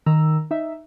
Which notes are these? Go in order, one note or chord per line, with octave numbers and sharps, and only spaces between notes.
D#3 A#5 E6
D#4 E5